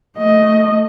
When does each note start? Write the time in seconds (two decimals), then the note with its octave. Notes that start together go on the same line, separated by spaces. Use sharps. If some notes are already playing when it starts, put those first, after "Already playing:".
0.18 A3 D#5